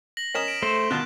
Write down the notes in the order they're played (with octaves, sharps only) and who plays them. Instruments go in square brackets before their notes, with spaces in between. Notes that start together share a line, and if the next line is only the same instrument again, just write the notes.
[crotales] A#6 F#7
[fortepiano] C#4 A#4 D#5 [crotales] B6 E7
[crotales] D7
[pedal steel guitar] A3 C5
[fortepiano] B2 D#3 C6 [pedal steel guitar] F4 F#4 A5 [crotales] F#6